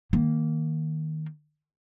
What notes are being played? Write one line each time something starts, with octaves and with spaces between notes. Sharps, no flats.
D#3 A#3